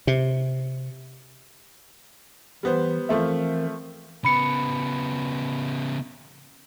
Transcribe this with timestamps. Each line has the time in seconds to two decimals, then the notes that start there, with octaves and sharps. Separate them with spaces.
0.07 C3
2.63 E3 G3 B3 C5
3.09 E3 F3 A3 C4 A#4 E5
4.25 C#3 B3 B5 C#7